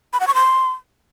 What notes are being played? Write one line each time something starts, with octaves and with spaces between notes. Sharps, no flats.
B5
F#5
C#6
C6